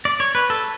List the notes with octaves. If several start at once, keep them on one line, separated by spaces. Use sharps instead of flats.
D5
C#5
B4
A4